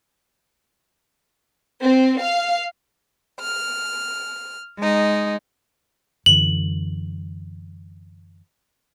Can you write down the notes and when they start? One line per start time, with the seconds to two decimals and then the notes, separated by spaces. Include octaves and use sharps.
1.82 C4
2.20 F5
3.40 F6
4.79 G#3 D#4
6.26 F#2 D3 E3 F#7